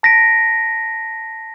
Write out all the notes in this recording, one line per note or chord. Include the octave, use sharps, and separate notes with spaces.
A5 A#6 B6 D7